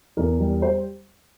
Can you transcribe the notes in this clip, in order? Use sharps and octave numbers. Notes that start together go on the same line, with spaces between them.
E2 A#4
G3
C5